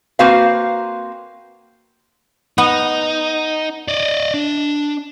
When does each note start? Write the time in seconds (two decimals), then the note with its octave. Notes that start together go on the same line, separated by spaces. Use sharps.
0.19 A#3 C4 F#4 B4 F5
2.58 B3 D#4
3.88 D5 D#5
4.34 D4